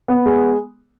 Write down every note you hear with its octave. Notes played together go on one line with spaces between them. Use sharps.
B3
G#3